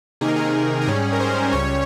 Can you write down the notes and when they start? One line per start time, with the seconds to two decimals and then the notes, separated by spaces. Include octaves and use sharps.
0.21 C3 D#3 A#3 D#4 G#4
0.28 A#4
0.36 G#4
0.82 A#4
0.87 G#2 G3 C#4 G#4
1.13 A#4
1.20 C5
1.52 C#2 C#3 G3 C#5